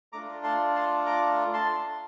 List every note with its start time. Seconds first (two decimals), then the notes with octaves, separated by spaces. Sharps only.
0.13 A3 D4 F4 A#5 D6
0.44 A5 C6
0.75 A5 C6
1.06 A#5 D6
1.53 A5 C6